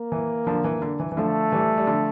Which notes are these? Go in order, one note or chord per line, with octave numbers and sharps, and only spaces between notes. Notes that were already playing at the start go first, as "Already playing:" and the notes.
Already playing: A#3
E3
D3 F3
E3
D3
E3
E3
D3 F3 A3
E3 G3
G3
D3 F3